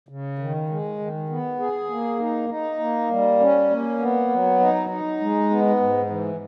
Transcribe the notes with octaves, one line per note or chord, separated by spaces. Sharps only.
C#3
D#3
G#3
D#3
B3
G#4
A#3
D#4
D#4
A#3
G3
C#4
A#3
B3
F#3
D#4
D#4
G#3
B3
G#2
E3